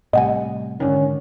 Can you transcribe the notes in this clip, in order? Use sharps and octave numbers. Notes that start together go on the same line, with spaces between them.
A2 C3 G3 D#5 F#5 G#5
G#2 D3 D#3 C#4